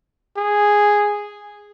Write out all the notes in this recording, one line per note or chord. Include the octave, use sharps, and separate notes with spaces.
G#4